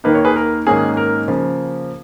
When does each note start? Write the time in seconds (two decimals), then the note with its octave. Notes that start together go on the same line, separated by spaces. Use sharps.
0.04 D#2 D#3 A#3 D#4 B4
0.15 C#5
0.25 G#4 B4
0.36 A#4
0.67 G#2 D#3 A#3 C#4 G#4
0.97 A#4
1.28 C#3 F3 A#3